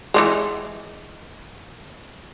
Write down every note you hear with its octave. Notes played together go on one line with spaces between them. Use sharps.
E3 F#3 G#3